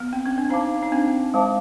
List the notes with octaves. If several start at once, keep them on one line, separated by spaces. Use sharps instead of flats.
B3
C4
C#4
D4
C#4 D#4 C5 F5 A5 D6
D#4
C4 D4
G#3 C5 F5 A5 D6